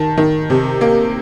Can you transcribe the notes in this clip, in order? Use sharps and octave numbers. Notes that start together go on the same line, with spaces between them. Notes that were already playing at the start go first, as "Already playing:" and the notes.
Already playing: D#3 A5
D#3
C3
A#3